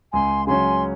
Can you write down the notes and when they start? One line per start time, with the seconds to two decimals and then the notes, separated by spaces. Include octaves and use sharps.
0.13 C#2 G#5 C6
0.47 C#3 F#3 C#4 G#5 C6